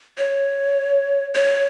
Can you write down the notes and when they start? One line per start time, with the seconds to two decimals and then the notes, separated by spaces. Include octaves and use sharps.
0.18 C#5
1.35 C#5